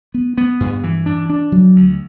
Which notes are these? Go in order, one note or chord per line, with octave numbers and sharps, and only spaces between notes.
B3
B3
G2
E3
D4
D4
F#3
D2